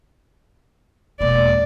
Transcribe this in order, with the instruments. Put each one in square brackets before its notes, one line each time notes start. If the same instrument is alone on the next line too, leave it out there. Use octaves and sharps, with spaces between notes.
[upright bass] E1 A#3 [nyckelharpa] D5